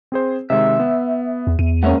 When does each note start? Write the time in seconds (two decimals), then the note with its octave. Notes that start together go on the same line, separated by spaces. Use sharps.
0.12 C4 G#4 C5
0.50 C3 D#3 G#3 E5
0.80 B3
1.47 E2
1.59 E2 D#7
1.83 G#2 A#3 C#4 E5 F#5